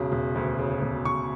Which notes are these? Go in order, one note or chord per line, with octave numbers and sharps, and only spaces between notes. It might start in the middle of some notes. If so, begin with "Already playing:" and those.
Already playing: E1 C#3
E1
D2
C#3
E1
E1 C#6